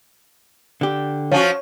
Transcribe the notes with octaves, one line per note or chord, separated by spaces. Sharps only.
D3 G4
F3 C#4 F#4 C#5